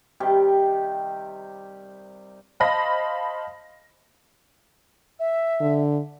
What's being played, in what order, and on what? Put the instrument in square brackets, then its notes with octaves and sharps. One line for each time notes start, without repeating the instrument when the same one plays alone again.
[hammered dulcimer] C3 D#3 G3 G4
[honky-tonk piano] C5 D#5 F5 A5 B5 A#6
[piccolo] E5
[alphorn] D3